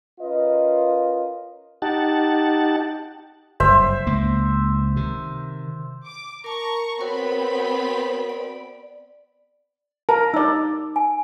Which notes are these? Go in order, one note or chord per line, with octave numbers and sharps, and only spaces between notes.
C#4 F4 A#4 B4 D#5
D#4 G4 F#5 A5
F#1 G2 C5 E5
C#2 A#3
C3 D#3
D6
A#4 A5 A#5 C#6
B3 C4 F#4 A#4 C#5 B5
D5
A#4 A5
D#4 D5 E6
G#5